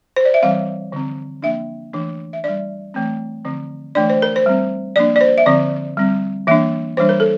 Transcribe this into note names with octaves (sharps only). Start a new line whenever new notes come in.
C5
D5
E5
E3 G3 C4 F5
D3 F3 C4
F3 A#3 D4 E5
E3 A3 D4
E5
G3 D4 D5
E3 A3 C4
D3 F3 C4
E3 A3 D4 D5
C5
A#4
C5
G3 C4
F3 A#3 D4 D5
D5
C5
E5
D3 F3 C4 D5
G3 C4
E3 A#3 D4 E5
E3 G3 D4 C5
A#4
A4